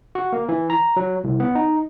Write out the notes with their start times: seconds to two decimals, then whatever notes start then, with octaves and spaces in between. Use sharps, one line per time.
0.15 F#4
0.33 A#3
0.49 E3
0.70 A#5
0.96 F#3
1.24 C2
1.40 B3
1.55 D#4